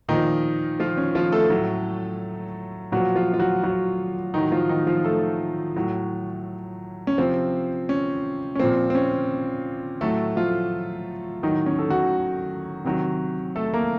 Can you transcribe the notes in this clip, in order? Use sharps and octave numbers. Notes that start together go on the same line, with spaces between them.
A#2 D#3 F3 D#4
F3 F4
C#4
F3 F4
A3 A4
A2 F#3
A#2 F3 F#3 F#4
F3 F4
F4
F#3 F#4
F#3 F#4
A2 D#3 F#3 D#4
F3 F4
D#3 D#4
F3 F4
A3 A4
A2 F#3
C#4
C3 F3 C4
C#4
C#4
A#2 F3 C4
C4
C#4
A2 F#3 A3 A4
F3 F4
A2 D#3 F#3 D#4
C#4
A4
F#3 F#4
C3 D#3 F#3
A3 A4
A#3 A#4